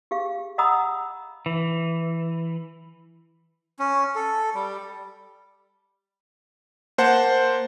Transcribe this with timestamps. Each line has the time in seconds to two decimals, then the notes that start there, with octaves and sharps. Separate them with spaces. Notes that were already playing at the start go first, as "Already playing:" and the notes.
0.11 G4 G#4 F5
0.58 D#5 F#5 A#5 B5 D#6 E6
1.46 E3
3.79 C#4
4.16 A4
4.55 G3
6.98 A#3 C5 F#5 A5